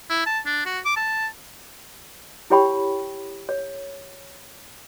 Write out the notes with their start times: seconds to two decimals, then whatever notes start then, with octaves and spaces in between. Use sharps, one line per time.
0.09 E4
0.26 A5
0.46 D4
0.66 F#4
0.85 D6
0.97 A5
2.50 E4 G4 C#5 G5 B5 C#6
3.49 C#5